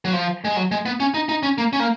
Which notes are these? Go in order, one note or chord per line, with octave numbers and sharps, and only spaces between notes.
F#3
F3
G#3
F#3
G#3
B3
C#4
D#4
D#4
C#4
A#3
C#4
A#3